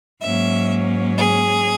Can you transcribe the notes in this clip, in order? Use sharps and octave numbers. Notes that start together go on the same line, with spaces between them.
G#2 F#3 A#3 C#4 E5
G#4